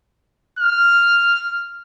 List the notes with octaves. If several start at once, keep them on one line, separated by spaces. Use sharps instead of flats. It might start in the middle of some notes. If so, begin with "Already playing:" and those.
F6